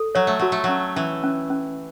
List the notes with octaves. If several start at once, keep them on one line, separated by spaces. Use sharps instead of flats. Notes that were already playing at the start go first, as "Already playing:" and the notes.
Already playing: A4
F#3 C#5
A3
F#3 F#4
A3
F#3 C#4
E3 C#4
C#4
C#4